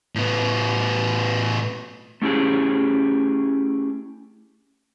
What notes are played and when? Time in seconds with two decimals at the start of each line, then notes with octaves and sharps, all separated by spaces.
0.15 A2 B3
2.22 A3 C#4 E4 G4 G#4